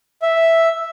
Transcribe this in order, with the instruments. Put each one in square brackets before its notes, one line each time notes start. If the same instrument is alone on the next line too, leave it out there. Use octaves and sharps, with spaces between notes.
[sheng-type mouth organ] E5